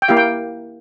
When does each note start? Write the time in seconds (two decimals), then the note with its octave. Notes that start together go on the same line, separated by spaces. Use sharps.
0.02 G5
0.08 A#3 E4 G4 F5
0.17 G5